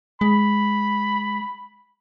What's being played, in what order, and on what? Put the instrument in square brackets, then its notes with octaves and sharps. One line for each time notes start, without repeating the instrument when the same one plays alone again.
[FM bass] G#3 [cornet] B5